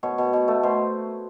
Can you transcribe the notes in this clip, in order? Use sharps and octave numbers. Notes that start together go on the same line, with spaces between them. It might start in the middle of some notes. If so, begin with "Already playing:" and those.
B2 C#5
B2
B2
A3
B2 C5